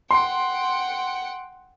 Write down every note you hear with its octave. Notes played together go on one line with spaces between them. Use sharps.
F#5 G5 C6